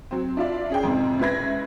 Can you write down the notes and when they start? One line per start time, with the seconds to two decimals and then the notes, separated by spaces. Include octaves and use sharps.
0.11 F#3 C4
0.37 D4 E4 F4 D5
0.70 C#4 G#4 G5
0.83 F2 G#2 C3
1.19 C#2 E4 B4 G#6 A#6